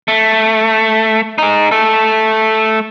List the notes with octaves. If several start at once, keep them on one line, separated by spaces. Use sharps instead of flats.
A3
D#4 G#4
A3 A4